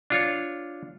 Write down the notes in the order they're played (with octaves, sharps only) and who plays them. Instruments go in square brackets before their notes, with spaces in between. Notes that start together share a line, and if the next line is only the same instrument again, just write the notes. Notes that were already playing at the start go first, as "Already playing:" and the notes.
[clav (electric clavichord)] D4 F4 C#5